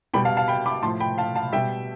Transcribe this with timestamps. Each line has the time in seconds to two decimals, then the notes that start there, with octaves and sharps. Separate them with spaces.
0.14 B2 G3 G5 B5
0.25 F5 A5
0.37 F5 A5
0.48 G5 B5
0.66 B5 D6
0.83 A2 F3 A5 C6
1.00 G5 B5
1.18 F5 A5
1.36 F5 A5
1.53 B2 G3 E5 G5